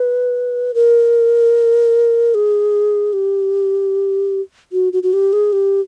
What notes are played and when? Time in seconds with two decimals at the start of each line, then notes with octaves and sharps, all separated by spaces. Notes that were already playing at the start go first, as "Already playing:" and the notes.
Already playing: B4
0.74 A#4
2.34 G#4
3.13 G4
4.72 F#4
4.93 F#4
5.03 F#4
5.13 G4
5.33 G#4
5.53 G4